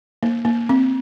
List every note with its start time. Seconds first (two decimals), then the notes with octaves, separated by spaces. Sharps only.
0.23 A#3
0.45 A#3
0.69 C4